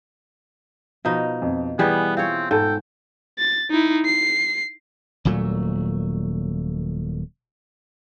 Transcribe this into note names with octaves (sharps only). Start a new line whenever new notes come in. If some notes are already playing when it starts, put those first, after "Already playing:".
B2 F3 D#4
F2
E3 G3 B3 G#4
C4 F4 C#5
G#2 A4 G5
A6
D#4 E4
C7
D#1 A#2 F#3 A3